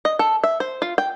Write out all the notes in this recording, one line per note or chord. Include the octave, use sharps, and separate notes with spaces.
D#5
A4
E5
C5
F4
G5